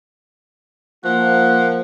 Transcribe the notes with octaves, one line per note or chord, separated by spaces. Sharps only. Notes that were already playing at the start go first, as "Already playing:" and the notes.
F3 A#3 F4 F#5